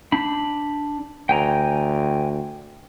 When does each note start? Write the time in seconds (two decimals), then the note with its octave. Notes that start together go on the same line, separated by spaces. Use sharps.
0.12 D4 B5
1.29 D2 G5 G#5 A#5